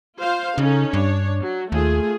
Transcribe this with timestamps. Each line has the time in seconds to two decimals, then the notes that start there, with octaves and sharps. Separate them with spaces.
0.20 F4 C5 F5
0.58 C#3 C#4 D#4 A4
0.93 G2 D4 C#5
1.41 F#3
1.72 D#2 A3 F4 G#4